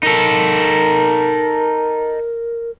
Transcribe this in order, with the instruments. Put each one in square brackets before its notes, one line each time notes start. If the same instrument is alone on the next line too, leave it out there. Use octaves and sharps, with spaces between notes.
[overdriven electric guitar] D#4 A4 [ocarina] A#4